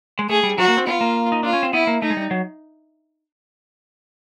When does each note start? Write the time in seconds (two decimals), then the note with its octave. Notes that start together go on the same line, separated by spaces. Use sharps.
0.19 G#3
0.29 A3 G#4
0.43 G3
0.58 F#3 F#4
0.68 A#3
0.77 C4
0.87 B3 F4
1.01 A#3
1.32 D#4
1.43 D4 F4
1.53 C#4
1.63 C4
1.73 B3 E4
1.87 A#3
2.02 A3 D#4
2.10 G#3
2.17 G3
2.31 F#3